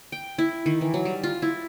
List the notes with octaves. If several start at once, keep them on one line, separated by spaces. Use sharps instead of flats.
G5
E4
D#3
E3
F#3
G3
F4
E4